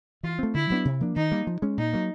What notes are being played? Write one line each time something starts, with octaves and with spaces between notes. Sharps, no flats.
E3 F4
A3 C4
D3 E4
F#3 B3 D4
C3
F3 A#3 D4
D#3 D#4
G3 A#3
F3
G#3 C#4
A#2 D#4
F#3 A#3